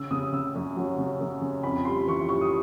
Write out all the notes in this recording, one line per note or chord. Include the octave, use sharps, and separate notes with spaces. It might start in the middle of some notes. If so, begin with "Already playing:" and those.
Already playing: C#3 E6
C#3 D#6
C#3 E6
F#2
F#3
C#3
F#2
C#3
F2 B5
G3 C6
E3 C#6
G3 C#6
D#6